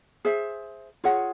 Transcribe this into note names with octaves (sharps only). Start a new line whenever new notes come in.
G#4 C5 E5
F4 G#4 C#5 F#5